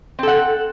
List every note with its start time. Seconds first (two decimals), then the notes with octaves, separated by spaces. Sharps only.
0.19 C4
0.23 A4
0.28 F#5